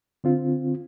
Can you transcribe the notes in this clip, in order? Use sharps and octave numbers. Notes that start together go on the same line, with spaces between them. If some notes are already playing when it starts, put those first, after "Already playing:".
D3 C4 F4